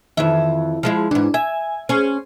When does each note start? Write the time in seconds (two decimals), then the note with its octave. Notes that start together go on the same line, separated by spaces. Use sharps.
0.17 F2 D#3 E3 E5
0.83 F3 G#3 E4
1.11 G#2 E3 D4
1.34 E5 G#5
1.89 C#4 G#4 C5